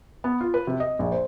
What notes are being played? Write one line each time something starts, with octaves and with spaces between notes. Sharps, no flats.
B3
F4
B4
C3
D#5
A#1
C5